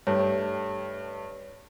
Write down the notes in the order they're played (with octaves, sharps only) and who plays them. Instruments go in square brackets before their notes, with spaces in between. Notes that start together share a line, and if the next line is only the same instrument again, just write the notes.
[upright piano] G2 A3 G4 [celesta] C#5